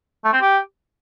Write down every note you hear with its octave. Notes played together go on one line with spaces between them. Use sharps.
A3
C4
G4